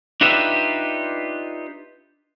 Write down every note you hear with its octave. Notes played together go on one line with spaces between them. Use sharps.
D4 D#4 F4 G4 B4 E5